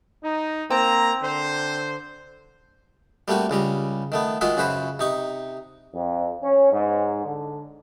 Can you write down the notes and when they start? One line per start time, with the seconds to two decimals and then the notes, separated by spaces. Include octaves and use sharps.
0.24 D#4
0.70 A#3 C4 A#5
1.22 D3 C5
3.28 G3 A3 A#3 C4 F#4
3.50 C#2 C#3 G3 A#5
4.12 D#3 A3 B3
4.41 D#3 G#3 F4 F#4 G#4 E5
4.57 F#2 C#3 F#4 B4 C5
4.99 C3 D#4 C#6
5.95 F2
6.43 C#4
6.72 G#2
7.25 D3